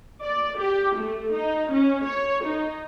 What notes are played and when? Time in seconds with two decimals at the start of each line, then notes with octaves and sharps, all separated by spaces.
0.23 D5
0.58 G4
0.96 A3
1.33 D#4
1.71 C#4
2.05 C#5
2.45 D#4